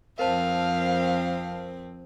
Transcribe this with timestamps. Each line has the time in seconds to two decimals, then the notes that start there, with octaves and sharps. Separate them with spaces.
0.19 F2 C4 A#4 C5 F5 A5